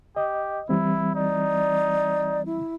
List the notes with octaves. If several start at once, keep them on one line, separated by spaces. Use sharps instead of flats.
G4 D#5
E3 G3 C4 E4
D#4 D5
E4